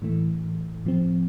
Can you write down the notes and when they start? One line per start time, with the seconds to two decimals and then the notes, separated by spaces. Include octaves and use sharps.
0.02 A2 E3 A3
0.85 A2 F3 C4